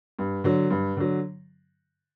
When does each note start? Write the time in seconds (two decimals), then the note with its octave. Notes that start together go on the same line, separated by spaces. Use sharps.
0.19 G2
0.44 D3 F#3
0.70 G2
0.97 D3 F#3